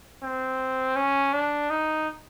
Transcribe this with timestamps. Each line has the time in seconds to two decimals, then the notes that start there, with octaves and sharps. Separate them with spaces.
0.23 C4
0.96 C#4
1.33 D4
1.70 D#4